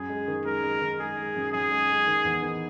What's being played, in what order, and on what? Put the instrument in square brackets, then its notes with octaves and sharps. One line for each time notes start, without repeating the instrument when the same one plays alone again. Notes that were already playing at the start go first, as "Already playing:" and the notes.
Already playing: [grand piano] F#2 [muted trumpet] G#4
[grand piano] G#3
D#3
[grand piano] G#3 [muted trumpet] A#4
[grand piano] G#3
D#3
[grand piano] G#3 [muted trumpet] G#4
[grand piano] G#3
F#2
[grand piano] F#2 [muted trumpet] G#4
[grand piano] G#3
G#3
D#3
E2
D#3